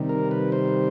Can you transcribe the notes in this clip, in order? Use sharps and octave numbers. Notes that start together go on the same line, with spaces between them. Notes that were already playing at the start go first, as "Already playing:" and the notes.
Already playing: C3 D#3 G3
A#4
B4
C5